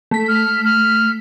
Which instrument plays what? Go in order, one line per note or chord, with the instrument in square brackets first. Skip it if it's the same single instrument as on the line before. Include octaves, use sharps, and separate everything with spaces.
[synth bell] A3 B6
[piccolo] F6
F6